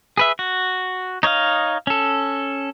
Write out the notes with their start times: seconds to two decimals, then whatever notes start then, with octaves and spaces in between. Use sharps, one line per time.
0.17 G#4 B4 E5
0.39 F#4
1.23 D#4 C#5 D#5 F5
1.87 C#4 A4